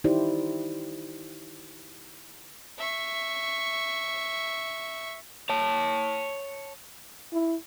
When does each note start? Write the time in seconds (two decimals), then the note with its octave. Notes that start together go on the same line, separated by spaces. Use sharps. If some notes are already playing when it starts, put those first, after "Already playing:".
0.04 D#3 D#4 E4 G4 C5 D5
2.78 E5 C#6
5.49 C#5 A5
7.33 E4